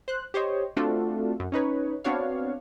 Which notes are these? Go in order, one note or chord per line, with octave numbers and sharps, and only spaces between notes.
C5 F#6
G4 C5 C#5 D#5
A3 C4 D4 F4 F#4 A4
F#2
C#4 D#4 B4 C#5
B3 C4 D4 F#4 C#5 F5